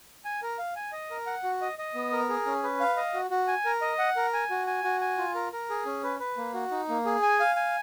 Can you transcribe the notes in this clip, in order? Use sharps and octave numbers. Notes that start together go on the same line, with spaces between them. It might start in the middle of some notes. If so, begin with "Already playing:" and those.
G#5
A#4
F5
G#5
D#5
A#4
F#5
F#4
D#5
D#5
B3
A#4
G#4
C#4
B4
F5
D#5
F#4
F#4
G#5
A#4
D#5
F#5
A#4
G#5
F#4
G#5
F#4
G#5
F4
A#4
A#4
G#4
C#4
B4
B4
A#3
F#4
D#4
A#3
G#4
G#5
F5
G#5